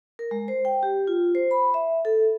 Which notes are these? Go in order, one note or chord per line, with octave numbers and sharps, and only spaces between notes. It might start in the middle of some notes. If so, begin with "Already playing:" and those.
A#4
G#3
C5
G5
G4
F4
C5
B5
E5
A4